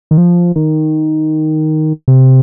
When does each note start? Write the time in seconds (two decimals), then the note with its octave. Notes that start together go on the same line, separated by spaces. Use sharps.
0.11 D#3
0.18 F3
0.56 D#3
2.08 C3